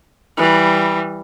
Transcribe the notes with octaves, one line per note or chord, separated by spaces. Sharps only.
E3 G3